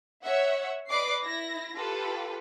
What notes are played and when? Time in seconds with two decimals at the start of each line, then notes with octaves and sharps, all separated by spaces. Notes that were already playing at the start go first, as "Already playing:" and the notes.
0.23 C#5 E5 F#5
0.88 B4 D5 D#5 D6 C7
1.23 E4 A#6
1.75 F4 G4 A4 B4